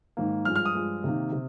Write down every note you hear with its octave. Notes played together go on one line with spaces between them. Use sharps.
G#2 D#3 A#3
G2 F3 G#3 F6
F6
D#6
G2 F3 G#3
C3 D#3 A#3
C3